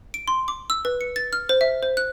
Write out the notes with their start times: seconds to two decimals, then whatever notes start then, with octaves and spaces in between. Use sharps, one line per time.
0.14 D7
0.28 C6
0.48 D6
0.70 E6
0.85 B4
1.01 C#7
1.16 A6
1.33 F6
1.49 C5
1.61 E5
1.83 C5
1.97 F#6